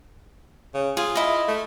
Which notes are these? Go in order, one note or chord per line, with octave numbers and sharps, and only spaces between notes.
C#3
F4 G#4
E4 D#5
A3